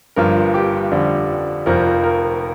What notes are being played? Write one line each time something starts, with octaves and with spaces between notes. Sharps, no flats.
G1 G2 F3 A#4
G4
F2 D3 G3
F1 F2 F3 A#4
A#4